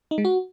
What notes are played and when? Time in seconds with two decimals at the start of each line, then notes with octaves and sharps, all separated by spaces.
0.11 D#4
0.18 G#3
0.25 F#4